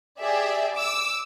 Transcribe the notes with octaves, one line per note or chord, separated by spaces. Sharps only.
G4 G#4 D5 E5
D6 E6